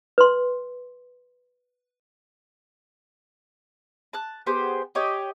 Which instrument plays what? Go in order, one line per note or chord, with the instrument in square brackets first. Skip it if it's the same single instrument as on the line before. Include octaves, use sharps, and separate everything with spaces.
[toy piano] B4 C6
[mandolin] A5 F#6
B3 G4 G#4 C5
G4 C#5 D#5 G5